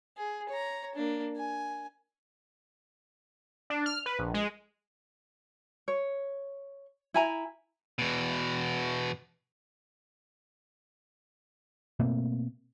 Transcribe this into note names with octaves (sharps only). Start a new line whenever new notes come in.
G#4
C#5 A#5
A#3 D4
G#5
D4
F6
B4
A#1
G#3
C#5
E4 G#5 A#5
E2 B2
B2 A3 A#3 C4